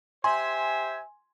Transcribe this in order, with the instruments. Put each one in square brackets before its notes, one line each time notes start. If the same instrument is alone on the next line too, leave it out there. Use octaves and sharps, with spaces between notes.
[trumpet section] G4 C5 E5 [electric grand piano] G#5 [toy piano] C6